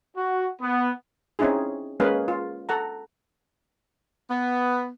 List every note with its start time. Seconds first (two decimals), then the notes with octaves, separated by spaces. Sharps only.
0.16 F#4
0.62 B3
1.39 C4 C#4 D#4 E4 G#4
2.00 G#3 A#3 C#4 G#4 B4 F5
2.28 F4
2.69 A4 F#5 A#5
4.30 B3